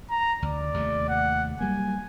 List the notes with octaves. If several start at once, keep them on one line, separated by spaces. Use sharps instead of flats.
A#5
D2 D5
D#2 C3 A3
F#5
F#3 G3 A#3 G#5